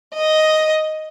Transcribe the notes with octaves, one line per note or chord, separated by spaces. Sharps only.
D#5